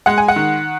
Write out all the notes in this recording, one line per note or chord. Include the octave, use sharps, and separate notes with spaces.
G#3 F#5
G#5
F#5
D#3